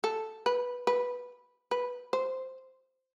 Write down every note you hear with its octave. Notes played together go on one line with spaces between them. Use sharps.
A4
B4
B4
B4
C5